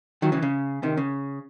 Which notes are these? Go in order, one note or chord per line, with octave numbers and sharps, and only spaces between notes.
D#3 F#3
C#3 E3
C#3
C3 D#3
C#3